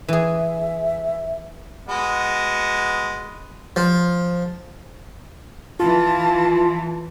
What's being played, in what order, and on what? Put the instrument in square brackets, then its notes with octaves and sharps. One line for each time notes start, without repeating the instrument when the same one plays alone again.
[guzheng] E3 G#4 [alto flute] E5
[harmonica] G#3 B3 F#4
[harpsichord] F3
[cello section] E3 [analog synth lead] F4 [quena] A5